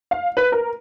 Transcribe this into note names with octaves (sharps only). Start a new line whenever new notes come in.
F5
B4
A#4